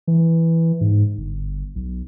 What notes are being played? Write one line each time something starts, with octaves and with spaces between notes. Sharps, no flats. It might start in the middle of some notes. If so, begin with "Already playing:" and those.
E3
G#2
G1
B1